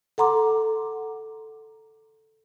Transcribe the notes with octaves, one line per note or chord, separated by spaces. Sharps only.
A4 F#5 A#5 C6 D6